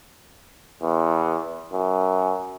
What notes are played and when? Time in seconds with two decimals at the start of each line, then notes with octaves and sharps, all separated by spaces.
0.82 E2
1.73 F#2